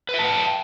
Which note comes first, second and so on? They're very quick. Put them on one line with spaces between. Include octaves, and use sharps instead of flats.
B4 E5 A5 F#5 G5